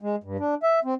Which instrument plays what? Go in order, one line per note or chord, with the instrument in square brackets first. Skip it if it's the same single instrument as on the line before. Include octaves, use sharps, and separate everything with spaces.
[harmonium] G#3
G2
D4
E5
C4